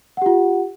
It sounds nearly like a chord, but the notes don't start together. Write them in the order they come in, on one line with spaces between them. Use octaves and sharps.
F#5 G4 F4